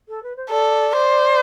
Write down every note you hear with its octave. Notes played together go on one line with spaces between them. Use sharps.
A4
B4
C5
A4 D5
C5